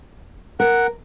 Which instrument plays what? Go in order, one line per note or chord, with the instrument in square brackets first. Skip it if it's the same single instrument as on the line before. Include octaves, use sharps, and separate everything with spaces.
[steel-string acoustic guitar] A#4 [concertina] F#5